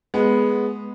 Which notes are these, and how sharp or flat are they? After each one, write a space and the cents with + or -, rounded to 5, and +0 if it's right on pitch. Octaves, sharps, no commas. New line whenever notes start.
G#3 +5 B3 +0